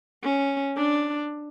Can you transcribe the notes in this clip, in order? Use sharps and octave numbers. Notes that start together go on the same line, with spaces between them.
C#4
D4